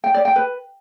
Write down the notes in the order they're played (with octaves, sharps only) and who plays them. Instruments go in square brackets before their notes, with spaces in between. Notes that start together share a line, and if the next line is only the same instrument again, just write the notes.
[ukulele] G5
D5
G5
B4